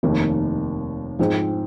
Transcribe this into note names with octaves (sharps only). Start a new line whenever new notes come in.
F1 D#2 D#3 A#3
G#2 F3 C4 G#4